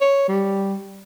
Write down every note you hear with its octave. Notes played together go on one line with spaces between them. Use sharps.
C#5
G3